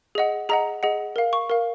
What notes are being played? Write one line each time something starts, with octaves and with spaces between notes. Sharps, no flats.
G#4 D#5 F#5
G#4 D#5 F#5 A#5
G#4 D#5 F#5
A#4 F5
C#6
A#4 F5